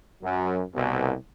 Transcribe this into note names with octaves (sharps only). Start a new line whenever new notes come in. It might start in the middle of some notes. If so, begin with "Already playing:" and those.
F#2 F#3
C2 B2